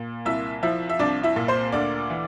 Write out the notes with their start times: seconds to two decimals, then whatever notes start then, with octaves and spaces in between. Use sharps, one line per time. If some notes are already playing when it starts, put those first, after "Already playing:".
Already playing: A#2
0.25 C2 E4 E5
0.63 F3 E4 E5
0.89 E5
0.99 C2 D4 D5
1.23 E4 E5
1.36 A#2
1.48 C5 C6
1.72 D2 D5 D6
2.10 E3